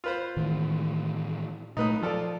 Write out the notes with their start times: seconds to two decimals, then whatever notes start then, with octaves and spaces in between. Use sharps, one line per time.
0.04 F4 B4 C5
0.37 A2 D#3 E3
1.77 A#2 A3 D#4 B4 D#6
2.02 F3 F4 A4 D5